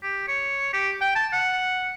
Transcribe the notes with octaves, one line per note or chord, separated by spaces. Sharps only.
G4
C#5
G4
G5
A5
F#5